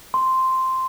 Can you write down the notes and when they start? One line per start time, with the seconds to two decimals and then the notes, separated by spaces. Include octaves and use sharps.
0.14 C6